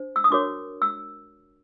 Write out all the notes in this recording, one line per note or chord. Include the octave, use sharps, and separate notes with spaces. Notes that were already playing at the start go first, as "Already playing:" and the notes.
Already playing: D4 C5
E6
D#6
D4 F#4 A#4 C#5 D6
E6